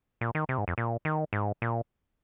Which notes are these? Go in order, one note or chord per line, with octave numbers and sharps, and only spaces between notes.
A#2
D#3
C3
G#2
F2
A#2
D#3
G#2
A#2